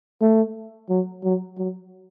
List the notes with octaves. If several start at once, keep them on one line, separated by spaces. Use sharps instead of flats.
A3
F#3
F#3
F#3